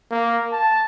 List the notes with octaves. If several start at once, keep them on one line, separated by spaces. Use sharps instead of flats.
A#3
A5